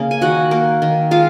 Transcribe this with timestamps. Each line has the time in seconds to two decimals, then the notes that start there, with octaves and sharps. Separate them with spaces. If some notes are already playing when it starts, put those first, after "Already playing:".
Already playing: C#3 A#3
0.11 G#5
0.21 D#3 F#4 F#5
0.51 A#3
0.82 D#3
1.11 G#3 F4 F5